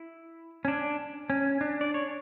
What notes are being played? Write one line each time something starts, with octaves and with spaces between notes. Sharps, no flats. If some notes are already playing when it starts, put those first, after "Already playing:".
Already playing: E4
C#4
D4
C#4
D4
D5
C#5